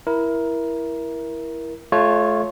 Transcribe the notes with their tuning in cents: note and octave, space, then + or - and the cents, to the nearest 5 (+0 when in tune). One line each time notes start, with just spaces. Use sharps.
E4 +5 A#4 +20
A3 -30 F4 +0 C#5 -5